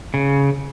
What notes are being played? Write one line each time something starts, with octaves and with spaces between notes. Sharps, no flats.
C#3